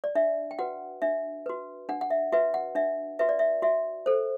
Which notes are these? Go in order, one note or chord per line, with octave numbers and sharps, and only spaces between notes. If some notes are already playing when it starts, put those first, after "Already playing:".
D5
D4 E5
G5
F#4 B4 F#5
D4 E5
F#4 B4
D4 F#5
F#5
E5
F#4 B4 E5
F#5
D4 E5
F#4 B4 E5
D5
E5
F#4 E5
A4 C5